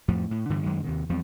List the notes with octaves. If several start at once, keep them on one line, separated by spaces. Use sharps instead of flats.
F2 A2 F3
A2
G2 D3 E3
F#2 D#3 F#3 G#3
D#2 C3 D#3
E2 F3 G3 C4